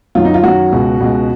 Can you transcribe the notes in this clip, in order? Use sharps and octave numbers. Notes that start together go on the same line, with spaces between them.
F#2 D#3 F#3 F4
D#4
F4
F#2 D#3 F#3 F#4
C#2 B2 G#3
C#2 B2 G#3